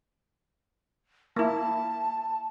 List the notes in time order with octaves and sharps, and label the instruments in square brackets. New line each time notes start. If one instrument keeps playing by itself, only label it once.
[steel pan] A#3 E4 [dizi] A5